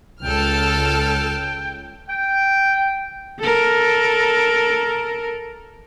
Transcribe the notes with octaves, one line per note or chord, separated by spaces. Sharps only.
C#2 A4 G5 A5 F6
G5
A4 A#4